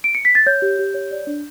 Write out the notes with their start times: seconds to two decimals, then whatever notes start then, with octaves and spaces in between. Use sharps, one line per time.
0.04 D7
0.15 C#7
0.25 B6
0.35 A6
0.46 C#5 G6
0.62 G4
0.79 G4
0.94 C#5
1.11 D5
1.27 D4